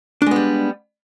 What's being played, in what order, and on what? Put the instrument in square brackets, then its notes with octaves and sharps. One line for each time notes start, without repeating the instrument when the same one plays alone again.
[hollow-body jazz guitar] D4
G#3
B3
G3